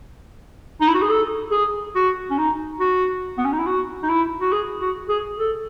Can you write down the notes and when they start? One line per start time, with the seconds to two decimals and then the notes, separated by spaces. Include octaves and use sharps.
0.81 D#4
0.88 E4
0.94 F#4
1.02 G#4
1.09 A4
1.51 G#4
1.95 F#4
2.30 C#4
2.38 D#4
2.80 F#4
3.38 B3
3.45 C#4
3.52 D#4
3.59 E4
3.67 F#4
4.03 D#4
4.09 E4
4.41 F#4
4.52 G#4
4.81 F#4
5.09 G#4
5.38 A4